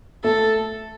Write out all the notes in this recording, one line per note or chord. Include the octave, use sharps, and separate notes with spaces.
A3 A4